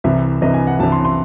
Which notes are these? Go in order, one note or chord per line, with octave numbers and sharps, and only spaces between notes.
C2 C3 E3 E5
C2 C3 E3 D#5
G#5
F#5
C2 C3 E3 A5
C6
C6